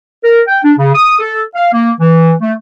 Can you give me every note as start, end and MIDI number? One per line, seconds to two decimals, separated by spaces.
0.24 0.41 70
0.48 0.59 79
0.64 0.72 62
0.78 0.94 49
0.95 1.19 87
1.20 1.41 69
1.55 1.68 77
1.73 1.91 58
2.00 2.33 52
2.42 2.52 57